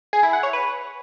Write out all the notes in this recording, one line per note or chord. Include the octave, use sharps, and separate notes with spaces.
G#4
E4
F#5
C#5
B4